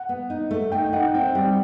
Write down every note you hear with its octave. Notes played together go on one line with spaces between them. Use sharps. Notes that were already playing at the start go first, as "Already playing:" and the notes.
Already playing: F#5
B3
D#4
A3
D#4 G5
D#4 F#5
C4 G5
G3